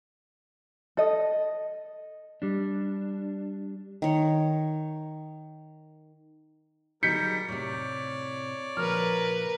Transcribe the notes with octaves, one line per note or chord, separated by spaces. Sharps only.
A4 D#5
G3 D4
D#3 C#5
F#3 G3 D#4 G#4 A#4 G6 B6 C#7
A2 C3 C#5 D5
A#2 C#3 F3 A#4 B4 F6